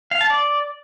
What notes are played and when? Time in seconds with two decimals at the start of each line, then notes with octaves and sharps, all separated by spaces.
0.11 F5
0.21 A5
0.30 D5